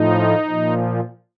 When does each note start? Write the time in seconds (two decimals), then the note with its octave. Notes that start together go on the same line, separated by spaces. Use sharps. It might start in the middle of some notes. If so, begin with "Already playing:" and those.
Already playing: A2 F3 D#4
0.47 A#2 F3